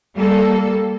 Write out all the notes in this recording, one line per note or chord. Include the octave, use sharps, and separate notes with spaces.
G3 A#3 A4